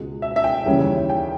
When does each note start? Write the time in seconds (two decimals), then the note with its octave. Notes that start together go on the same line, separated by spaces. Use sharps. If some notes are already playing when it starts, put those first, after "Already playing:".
Already playing: C#2 B2 G#3
0.22 E5
0.36 E5
0.44 G5
0.66 D#2 C#3 E3 G3 C#4
1.10 G5